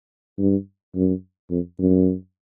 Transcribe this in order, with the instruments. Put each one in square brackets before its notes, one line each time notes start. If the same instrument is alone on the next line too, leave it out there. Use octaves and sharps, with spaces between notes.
[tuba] G2
F#2
F2
F#2